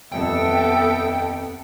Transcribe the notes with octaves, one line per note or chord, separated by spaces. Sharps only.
D#1 F2 B3 A4 E5 G5